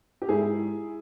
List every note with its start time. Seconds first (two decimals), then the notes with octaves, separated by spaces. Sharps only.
0.22 G4
0.29 G#2 E4 G#4